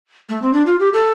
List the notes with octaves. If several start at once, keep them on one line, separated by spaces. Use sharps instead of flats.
A3
C4
D4
F4
G4
A4